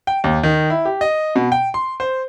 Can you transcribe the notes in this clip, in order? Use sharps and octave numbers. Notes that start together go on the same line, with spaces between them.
G5
D#2
D#3
E4
G4
D#5
B2
G5
C6
C5